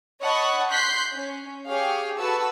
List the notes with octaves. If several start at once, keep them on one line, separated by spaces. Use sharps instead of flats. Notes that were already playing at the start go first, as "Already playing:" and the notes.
C#5 D#5 F#5 A5 B5 C#6
C6 F#6 G6 B6 C7
C#4
G4 G#4 C#5 F5
F#4 A4 B4 A5 E6